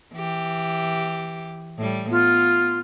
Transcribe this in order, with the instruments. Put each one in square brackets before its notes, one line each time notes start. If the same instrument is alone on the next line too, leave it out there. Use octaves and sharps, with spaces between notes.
[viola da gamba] E3 G4
A2 G3
[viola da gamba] B3 [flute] F4